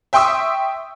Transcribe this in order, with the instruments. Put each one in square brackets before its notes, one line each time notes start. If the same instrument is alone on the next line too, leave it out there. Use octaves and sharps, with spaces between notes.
[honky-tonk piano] E5 G5 C6 C#6 D#6 E6